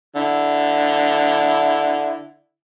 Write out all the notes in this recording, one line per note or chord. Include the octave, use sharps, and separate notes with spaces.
D3 E4